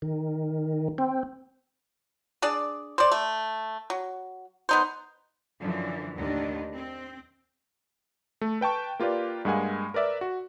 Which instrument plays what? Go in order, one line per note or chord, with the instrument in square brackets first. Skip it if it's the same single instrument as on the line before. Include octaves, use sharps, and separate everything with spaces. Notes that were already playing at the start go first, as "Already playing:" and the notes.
[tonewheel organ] D#3
C4
[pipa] D4 G#4 D5
C5 D5
A3
F#3
B3 D#4 C5
[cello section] F#2 D3 E3 F3
D#2 A2 D3 D#3 D4
C4
[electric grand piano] A3
B4 G5 A5 C#6
A#3 F4 G4 B4 D5
G2 G#3 A#3 F#5 G#5
A#4 B4 D5 E5
F#4